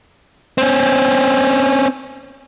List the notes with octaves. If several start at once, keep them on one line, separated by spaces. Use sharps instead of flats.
C4 C#4